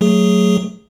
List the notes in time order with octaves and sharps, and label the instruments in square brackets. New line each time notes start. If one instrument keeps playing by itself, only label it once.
[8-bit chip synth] F#3 A3 G#4